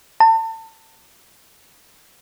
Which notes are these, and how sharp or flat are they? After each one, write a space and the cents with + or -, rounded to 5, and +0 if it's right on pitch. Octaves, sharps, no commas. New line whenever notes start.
A5 +30